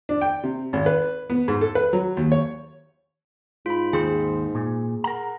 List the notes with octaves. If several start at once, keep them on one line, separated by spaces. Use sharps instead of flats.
D4
G5
C3
G#1
B4
B3
G#2
A4
B4
F#3
D#2
C#5
G#2 F4 B5
D#2 G#4 C5
A#2
A#4 F#5 A#5